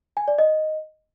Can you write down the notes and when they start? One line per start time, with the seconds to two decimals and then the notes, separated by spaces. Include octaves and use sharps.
0.17 G#5
0.28 D5
0.39 D#5